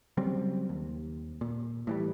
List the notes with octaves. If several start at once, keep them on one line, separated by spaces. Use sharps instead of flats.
C#3 F#3 G3 C4
D#2
A#2
A2 E3 G3